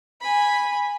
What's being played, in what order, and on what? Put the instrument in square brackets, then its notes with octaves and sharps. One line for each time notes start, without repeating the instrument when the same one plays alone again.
[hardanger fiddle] G#5 B5